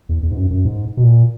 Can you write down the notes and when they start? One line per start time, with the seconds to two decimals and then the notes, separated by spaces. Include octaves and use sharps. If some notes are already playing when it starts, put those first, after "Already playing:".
0.09 E2
0.23 E2
0.31 G#2
0.37 F#2
0.51 F#2
0.65 G#2
0.97 B2
1.03 A#2